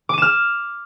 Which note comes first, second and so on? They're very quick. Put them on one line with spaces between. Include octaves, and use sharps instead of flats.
D6 D#7 E7 F6